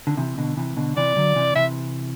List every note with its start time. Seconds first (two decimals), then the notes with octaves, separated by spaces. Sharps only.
0.07 D3
0.17 C3 E3
0.37 B2 D3
0.57 C3 E3
0.77 B2 D3
0.97 C3 E3 D5
1.16 D3 F#3
1.36 C3 E3
1.55 C3 E3 E5